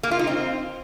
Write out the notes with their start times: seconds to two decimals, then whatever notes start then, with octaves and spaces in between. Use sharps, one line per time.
0.03 A#3
0.11 F4
0.19 D#4
0.27 C4